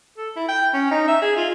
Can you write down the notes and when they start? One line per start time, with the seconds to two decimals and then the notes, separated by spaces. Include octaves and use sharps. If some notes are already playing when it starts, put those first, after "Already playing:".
0.17 A4
0.36 E4
0.48 G5
0.74 C#4
0.91 D#4
1.08 E5
1.22 G#4
1.37 F4